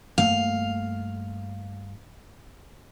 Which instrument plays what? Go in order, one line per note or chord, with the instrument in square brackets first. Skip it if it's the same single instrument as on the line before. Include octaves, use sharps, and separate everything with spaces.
[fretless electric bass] G2 A3 A#3 [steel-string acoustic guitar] F5